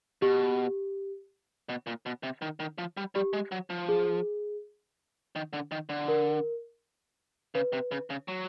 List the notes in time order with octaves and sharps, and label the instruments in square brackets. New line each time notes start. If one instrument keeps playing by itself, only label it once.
[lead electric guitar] B2 [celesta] G4
[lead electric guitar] B2
A#2
B2
C3
D#3
D#3
F3
G3
[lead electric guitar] G3 [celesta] G4
[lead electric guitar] G#3
F#3
F3
[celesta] G#4
[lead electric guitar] D#3
D3
D#3
D3
[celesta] A#4
[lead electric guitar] C#3 [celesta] B4
[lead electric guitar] C3
C#3
C#3
F#3